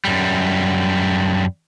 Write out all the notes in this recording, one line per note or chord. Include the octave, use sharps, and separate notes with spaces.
F#2 G3